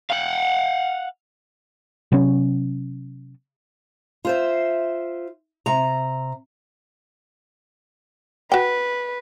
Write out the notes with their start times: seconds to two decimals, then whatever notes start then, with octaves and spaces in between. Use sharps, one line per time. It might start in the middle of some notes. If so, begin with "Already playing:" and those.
0.11 F5 F#5
2.12 C3 F#3 B3 C#4
4.25 F4 C5 E5
5.66 C3 A#5
8.52 F#4 B4 G5